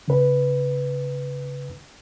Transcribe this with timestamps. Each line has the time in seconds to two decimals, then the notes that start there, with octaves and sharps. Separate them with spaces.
0.08 C#3 B4